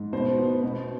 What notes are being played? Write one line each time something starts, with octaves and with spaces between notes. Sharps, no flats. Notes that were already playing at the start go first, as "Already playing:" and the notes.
Already playing: G#2
B2 C5
B3
B2